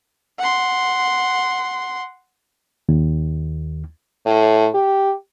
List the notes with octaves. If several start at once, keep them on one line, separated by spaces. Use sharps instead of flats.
F#5 C6
D#2
A2
G4